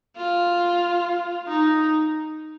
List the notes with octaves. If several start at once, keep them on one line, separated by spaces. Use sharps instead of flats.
F4
D#4